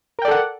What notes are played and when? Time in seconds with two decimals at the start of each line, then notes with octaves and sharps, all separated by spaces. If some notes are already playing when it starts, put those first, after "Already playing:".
0.19 A#4
0.22 G5
0.25 D5
0.28 A4
0.31 F#5